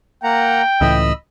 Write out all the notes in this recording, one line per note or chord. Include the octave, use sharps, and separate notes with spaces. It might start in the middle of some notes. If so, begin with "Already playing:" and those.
A#3 F#5 G5 A#5
C#2 A2 E3 D#5 B5 E6